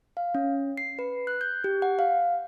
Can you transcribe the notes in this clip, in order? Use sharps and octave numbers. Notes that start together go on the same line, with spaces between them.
F5
C#4
C7
B4
F#6
G6
G4
F#5
F5